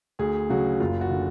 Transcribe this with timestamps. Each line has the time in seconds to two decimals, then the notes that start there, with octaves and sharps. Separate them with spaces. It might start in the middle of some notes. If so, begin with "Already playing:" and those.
0.19 D2 G#4
0.50 C#3 F#3 F#4
0.80 F#1 F4
1.01 F#4
1.10 D3